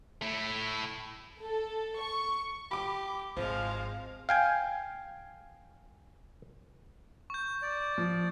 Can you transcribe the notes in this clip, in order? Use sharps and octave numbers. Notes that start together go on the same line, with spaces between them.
A3 E4
A4
C#6
G4 B5 D6
G#1 F3 G#3 C5 F5
F5 G5 G#5
C#6 G6
D5
F3